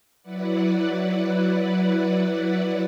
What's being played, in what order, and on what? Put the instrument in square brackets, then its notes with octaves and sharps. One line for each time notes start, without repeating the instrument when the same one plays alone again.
[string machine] F#3 E4 B4 D5 F#5